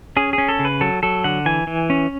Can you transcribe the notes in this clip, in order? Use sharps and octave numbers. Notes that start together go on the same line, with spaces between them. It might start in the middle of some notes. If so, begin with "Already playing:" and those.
C#4 G#4
C#4 G#4
A4
C#3
B4
F#3 A4
F#3 A4
D3 F#5
E3 G#5
E3
C#4